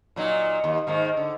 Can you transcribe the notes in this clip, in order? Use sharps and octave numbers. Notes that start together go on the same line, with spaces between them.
A#2 F#3 D#4
D#2
G#2 D#3 A#3
D3